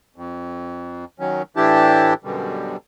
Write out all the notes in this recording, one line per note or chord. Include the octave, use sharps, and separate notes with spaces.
F2
D#3 F#3 C#4
A2 E3 D4 E4 G4 A5
F#2 B2 D3 G3